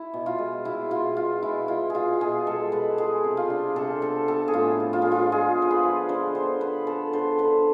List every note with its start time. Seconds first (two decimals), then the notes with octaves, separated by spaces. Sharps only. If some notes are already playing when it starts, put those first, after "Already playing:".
Already playing: E4
0.14 B2
0.26 F4
0.39 G#3
0.65 B2 E4
0.91 B2 F4
1.17 B2 F4
1.43 G#3 E4
1.68 G#3 F4
1.90 B2 F4 G#4
2.21 B2 G#4
2.47 G#3 A4
2.72 G#3 B4
2.98 G#3 G#4
3.24 C3
3.37 F4
3.50 D4
3.76 C3 A4
4.02 B3 A4
4.28 B3 A4
4.48 G#4
4.54 A2 F4
4.80 F3
4.93 F4
5.02 A2 G#4
5.12 F4
5.32 G#3 G#4
5.57 B3
5.62 C5
5.71 B4
5.83 F3
6.09 D3 C5
6.35 B3 C5
6.61 D3 B4
6.87 B3 A4
7.13 D3 C5
7.39 D3 B4